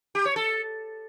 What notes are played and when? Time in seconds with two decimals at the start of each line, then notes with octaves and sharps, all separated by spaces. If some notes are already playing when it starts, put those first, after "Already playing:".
0.15 G4
0.25 C#5
0.36 A4